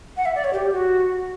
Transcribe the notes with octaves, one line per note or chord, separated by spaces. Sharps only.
F#5
E5
D5
C#5
G4
F#4